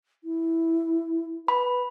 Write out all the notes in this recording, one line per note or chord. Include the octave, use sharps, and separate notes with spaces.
E4
B4 B5